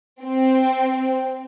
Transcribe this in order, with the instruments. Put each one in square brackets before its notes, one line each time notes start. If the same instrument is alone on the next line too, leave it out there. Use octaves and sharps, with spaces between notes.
[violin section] C4